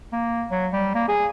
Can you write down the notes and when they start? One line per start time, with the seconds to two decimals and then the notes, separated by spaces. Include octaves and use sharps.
0.13 A#3
0.51 F#3
0.73 G3
0.95 A#3
1.08 G#4